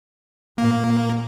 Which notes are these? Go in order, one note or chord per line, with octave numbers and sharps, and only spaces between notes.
A#2 A#3